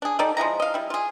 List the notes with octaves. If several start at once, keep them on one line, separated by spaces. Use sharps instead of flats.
D4 G#4
G3 D#4 A4 D5
F3 G#3 E4 A#5
D#5 F5
G3 E4
F4 G#4